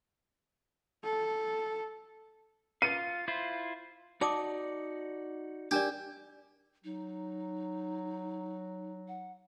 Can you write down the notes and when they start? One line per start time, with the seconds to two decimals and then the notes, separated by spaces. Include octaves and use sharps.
1.04 A4
2.82 F4 F5 C#7 D#7
3.28 E4 F4 C5
4.21 D#4 F#4 D5 A5 D6 D#6
5.71 D4 G4 A#4 D5
6.84 F#3 D#4
9.08 F#5